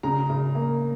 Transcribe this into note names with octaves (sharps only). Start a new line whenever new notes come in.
C#3 A#5
C#3
A#3